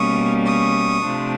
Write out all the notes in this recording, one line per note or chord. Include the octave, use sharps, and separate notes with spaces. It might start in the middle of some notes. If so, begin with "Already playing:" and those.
Already playing: B2 G3 A#3 C#4 C#6 D#6
C#6 D#6
C3 F3 A3 D4